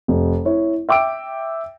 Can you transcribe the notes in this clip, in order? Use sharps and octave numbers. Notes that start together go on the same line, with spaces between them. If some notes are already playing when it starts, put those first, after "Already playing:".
F1
E4 C#5
E5 G5 D6 E6 D7